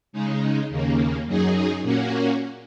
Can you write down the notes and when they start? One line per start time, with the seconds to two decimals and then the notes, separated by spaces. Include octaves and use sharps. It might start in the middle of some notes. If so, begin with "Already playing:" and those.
0.13 C#3 G#3 D#4
0.69 D#2 C#3 A#3
1.26 F#2 F#3 D#4 G#4
1.82 A#2 A#3 C#4 F#4